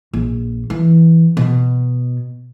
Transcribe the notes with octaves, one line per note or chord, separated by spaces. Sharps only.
A#1
E3
B2